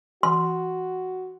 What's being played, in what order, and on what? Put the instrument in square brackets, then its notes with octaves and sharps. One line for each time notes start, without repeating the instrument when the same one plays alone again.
[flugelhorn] F#4 [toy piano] C6